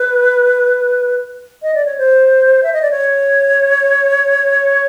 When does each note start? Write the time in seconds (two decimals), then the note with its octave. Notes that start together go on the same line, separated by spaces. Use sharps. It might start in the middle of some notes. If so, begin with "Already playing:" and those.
Already playing: B4
1.62 D#5
1.74 D5
1.85 C#5
1.98 C5
2.63 E5
2.73 D#5
2.82 D5
2.91 C#5